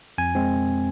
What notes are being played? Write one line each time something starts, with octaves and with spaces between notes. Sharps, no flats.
F2 G#5
G#3 C4